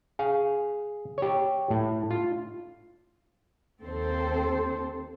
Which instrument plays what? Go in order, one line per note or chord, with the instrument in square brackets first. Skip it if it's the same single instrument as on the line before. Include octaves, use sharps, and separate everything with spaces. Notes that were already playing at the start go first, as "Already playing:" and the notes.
[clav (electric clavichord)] G#4 F5
G4 C#5
A2
F4
[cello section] D#2 C4 A4 C5